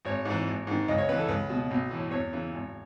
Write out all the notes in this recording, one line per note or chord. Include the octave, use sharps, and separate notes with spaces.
G#1 C#5
G#2 E3
G#1
G#2 D#3
C#2 D#5
C#5
C#3 E3 B4
A4
C#2 B4
B2
B1
A2 E3
E2 C#5
C#3 E3
G#1